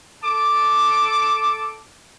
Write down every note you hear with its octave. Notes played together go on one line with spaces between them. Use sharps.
A4 A5 D6